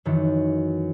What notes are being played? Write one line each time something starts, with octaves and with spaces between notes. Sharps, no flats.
F#2 D#3 E3